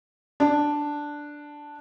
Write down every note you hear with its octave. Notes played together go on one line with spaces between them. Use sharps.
D4